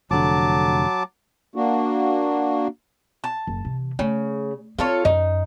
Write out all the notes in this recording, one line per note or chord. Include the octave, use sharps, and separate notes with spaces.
F1 D3 F#3 A5 D6
A#3 D4 F#4
A5
F#1
C3 E3
C#3 A3
C4 F4 A4 C#5
F#2 D#4